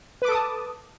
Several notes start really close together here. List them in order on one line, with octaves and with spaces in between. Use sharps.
B4 D6 A4 D#6 A5